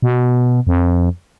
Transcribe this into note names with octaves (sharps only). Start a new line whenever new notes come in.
B2
F2